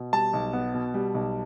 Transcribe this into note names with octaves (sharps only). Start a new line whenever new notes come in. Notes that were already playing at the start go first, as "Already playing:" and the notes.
Already playing: B2
G3 A5
B1
B3
B2
G3
B1